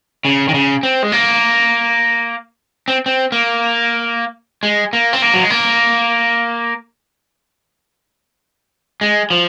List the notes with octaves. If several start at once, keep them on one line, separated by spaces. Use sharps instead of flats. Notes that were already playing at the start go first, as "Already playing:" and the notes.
C#3
D#3
C#3
C4
G#3
A#3
C4
C4
A#3
G#3
A#3
C4
A#3
F#3
G#3
A#3
G#3
F3